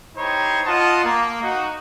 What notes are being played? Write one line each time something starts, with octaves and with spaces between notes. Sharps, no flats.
D#4 E4 G4 C5 C#5
F4 D#5 F#5 A5 C6
A#3
D#4 F#4